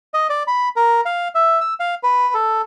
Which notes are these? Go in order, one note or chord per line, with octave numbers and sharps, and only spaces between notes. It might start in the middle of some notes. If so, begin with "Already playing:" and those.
D#5
D5
B5
A#4
F5
E5
E6
F5
B4
A4